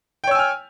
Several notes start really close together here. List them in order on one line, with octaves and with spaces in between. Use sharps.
G5 C#5 E6 G#5 F6